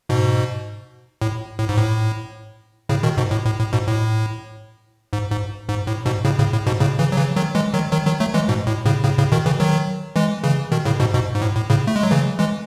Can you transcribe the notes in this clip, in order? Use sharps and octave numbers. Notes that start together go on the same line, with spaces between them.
G#2 B2
A2
A2
G#2
A2
A2 C#3
B2 D#3
G#2 B2
A2
A2
A2
G#2 B2
A2
G#2
G#2
G#2
A2
G#2 B2
A2 C#3
A2 C#3
A2
G#2 B2
A2 C#3
C#3 E3
F#3
C#3 E3
D#3 F#3
E3 G#3
D#3 F#3
D#3 F#3
D#3 F#3
F#3 A3
E3 G#3
G#2 B2
A2
A2 C#3
A2 C#3
A2 C#3
B2 D#3
C#3 E3
D#3 F#3
E3 G#3
C#3 E3
B2 D#3
A2 C#3
G#2 B2
G#2 B2
G#2
A2
A2
A2 C#3
A3
G#3
F#3
C#3 E3
E3 G#3